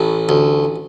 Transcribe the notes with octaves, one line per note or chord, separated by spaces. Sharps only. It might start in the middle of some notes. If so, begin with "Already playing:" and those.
Already playing: A1 A2
D2